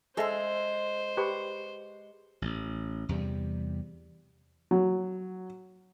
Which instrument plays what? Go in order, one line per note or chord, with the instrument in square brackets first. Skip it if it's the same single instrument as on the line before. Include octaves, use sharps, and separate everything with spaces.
[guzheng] G#3 C6 [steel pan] G#4 A4 E5 [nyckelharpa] C5
[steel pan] G4 B4 C#6
[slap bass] A1
E2 C3 G3
[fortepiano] F#3